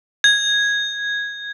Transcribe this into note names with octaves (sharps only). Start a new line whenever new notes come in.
G#6